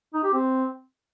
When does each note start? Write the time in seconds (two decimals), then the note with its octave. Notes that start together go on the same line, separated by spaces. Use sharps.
0.14 D#4
0.24 G4
0.33 C4